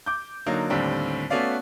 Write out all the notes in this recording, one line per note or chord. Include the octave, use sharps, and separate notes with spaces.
D6 G6
D3 F#3 A#3 D#4
D#2 A2 D3 G3 C4
A3 B3 C#4 F#4 D5 F5